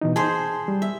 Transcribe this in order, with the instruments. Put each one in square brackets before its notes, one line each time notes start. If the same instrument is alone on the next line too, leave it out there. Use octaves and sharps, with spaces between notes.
[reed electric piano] B2 E3 D#4
[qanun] G#4 C5 [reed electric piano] A5 C6
[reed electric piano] G3
[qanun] E5